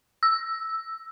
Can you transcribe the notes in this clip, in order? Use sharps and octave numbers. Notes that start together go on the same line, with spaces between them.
E6